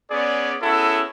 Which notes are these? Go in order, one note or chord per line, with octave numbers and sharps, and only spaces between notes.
B3 C#4 G#4 D5
B3 C#4 E4 F#4 G#4 A4